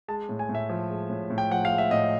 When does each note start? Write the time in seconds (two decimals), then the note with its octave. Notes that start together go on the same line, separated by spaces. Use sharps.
0.08 G#3 A5
0.29 A2
0.39 G#5
0.49 A2
0.55 E5
0.69 F3
0.90 G#3
1.10 A2
1.30 A2
1.38 G5
1.51 F3 F#5
1.65 F5
1.71 G#3
1.78 E5
1.91 A2 D#5